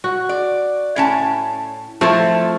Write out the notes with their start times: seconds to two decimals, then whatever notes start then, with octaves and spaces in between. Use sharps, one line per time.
0.04 F#4
0.29 D5
0.96 A2 C#4 A5
2.01 F3 A3 C4 E4 A4